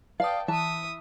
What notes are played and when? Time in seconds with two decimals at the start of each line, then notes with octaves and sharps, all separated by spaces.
0.20 B4 D5 F5 G5 A5 D#6
0.48 E3 E5 A5 D#6